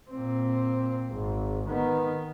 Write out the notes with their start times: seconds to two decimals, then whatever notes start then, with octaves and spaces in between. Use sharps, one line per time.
0.10 A#2 C4
1.11 G#1
1.68 D#3 B3